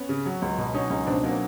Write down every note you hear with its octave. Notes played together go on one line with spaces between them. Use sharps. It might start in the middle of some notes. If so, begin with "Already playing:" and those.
Already playing: B3 C#4
C#3
F#3
C#2
B2
F#3 C#4 D#4
C#2 C#4 D#4
B2 C4 D4
F#3 A#3 C4